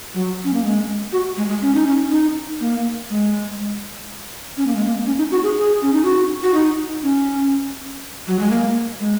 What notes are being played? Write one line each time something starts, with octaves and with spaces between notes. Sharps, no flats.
F#3
C#4
A#3
G#3
F#4
G#3
G#3
C#4
D#4
C#4
D#4
A#3
G#3
C#4
A#3
G#3
A#3
C#4
D#4
F#4
G#4
G#4
C#4
D#4
F#4
F#4
D#4
C#4
F#3
G#3
A#3
G#3